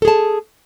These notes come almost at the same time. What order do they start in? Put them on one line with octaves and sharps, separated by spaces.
A4 G#4 A5